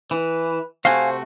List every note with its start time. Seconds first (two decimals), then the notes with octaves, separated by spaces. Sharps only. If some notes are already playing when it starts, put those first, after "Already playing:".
0.11 E3 B4
0.85 C3 A3 F#4 C5 F5 G5 G#5